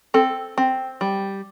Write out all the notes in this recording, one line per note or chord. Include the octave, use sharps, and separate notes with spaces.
C4 A4
C4
G3